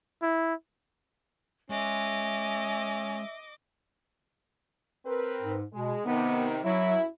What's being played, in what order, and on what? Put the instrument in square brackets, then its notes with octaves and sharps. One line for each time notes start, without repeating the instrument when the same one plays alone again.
[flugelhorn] E4
[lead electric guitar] G#3 [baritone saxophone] C#4 [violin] D#5 D6 [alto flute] E5
[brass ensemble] C4 A#4 B4
[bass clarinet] G#2
[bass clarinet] B2 [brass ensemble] G#3
[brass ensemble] C3 D#3 [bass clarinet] B3
[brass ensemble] F#2 E4 [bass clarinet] F#3